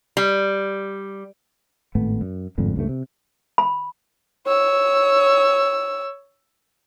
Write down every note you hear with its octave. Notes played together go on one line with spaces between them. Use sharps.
G3
G#1 A2 A3 B3
F#2
G1 F2 G#2 D3
C#2 G2 A3
C3
B5
C#5 E6